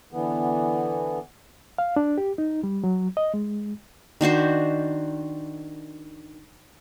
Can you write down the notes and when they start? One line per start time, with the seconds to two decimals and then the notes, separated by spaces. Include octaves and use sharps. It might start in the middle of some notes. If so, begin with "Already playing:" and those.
0.13 D3 E3 B3
1.78 F5
1.96 D4
2.18 G4
2.38 D#4
2.63 G3
2.84 F#3
3.17 D#5
3.34 G#3
4.21 D#3 D4 F#4 C5